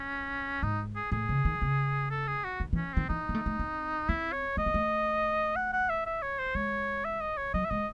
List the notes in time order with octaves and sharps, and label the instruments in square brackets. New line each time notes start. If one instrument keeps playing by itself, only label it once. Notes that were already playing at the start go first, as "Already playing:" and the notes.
Already playing: [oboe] C#4
[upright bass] G#2 [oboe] D#4
[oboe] G#4
[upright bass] A2 [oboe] G#4
[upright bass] C#3
D#3
C#3
[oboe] A4
G#4
F#4
[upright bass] D#3
E3
[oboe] C#4
[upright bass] D#3 [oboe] C4
[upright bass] E3 [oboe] D#4
[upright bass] C4
A3
A3
C4
[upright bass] C4 [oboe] E4
[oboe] C#5
[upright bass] A3 [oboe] D#5
[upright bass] C4
A3
[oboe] F#5
F#5
E5
E5
C#5
C5
[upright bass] G#3 [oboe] C#5
[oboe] E5
D#5
C#5
[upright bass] F#3 [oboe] D#5
[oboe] E5
[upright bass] G#3 [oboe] D#5